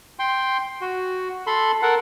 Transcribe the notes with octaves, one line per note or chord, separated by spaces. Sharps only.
G5 C6
F#4
A4 B5 C6
A4 A#4 F#5